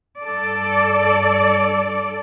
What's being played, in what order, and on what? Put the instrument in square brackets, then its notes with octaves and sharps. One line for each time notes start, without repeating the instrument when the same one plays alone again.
[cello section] G2 A4 D5